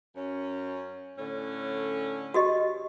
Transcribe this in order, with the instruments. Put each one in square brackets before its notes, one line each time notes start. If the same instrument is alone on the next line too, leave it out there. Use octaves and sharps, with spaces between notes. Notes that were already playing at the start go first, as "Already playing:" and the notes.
[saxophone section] F#2 C#4
A2 D3 C#4
[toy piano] F#4 G4 D#5